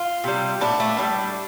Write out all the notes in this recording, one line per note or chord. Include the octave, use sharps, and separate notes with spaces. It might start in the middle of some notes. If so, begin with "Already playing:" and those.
Already playing: F4
C3 G3
A2 A3 D4
A3
A2 G3 D4